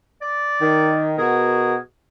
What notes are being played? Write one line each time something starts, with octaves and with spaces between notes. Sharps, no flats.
D5
D#3
B2 F#4 G#4 A#4